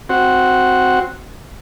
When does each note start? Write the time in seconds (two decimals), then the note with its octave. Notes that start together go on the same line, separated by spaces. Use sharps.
0.09 C4 F#4